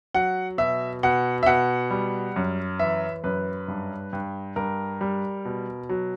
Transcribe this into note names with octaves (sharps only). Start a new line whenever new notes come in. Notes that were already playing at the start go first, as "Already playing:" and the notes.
F#3 F#5
B2 E5
B2 F#5
E5
B2 F#5
G3
F#2
E3 E5
F#2 B4
G2
G2
G2 A#4
G3
B2
F#3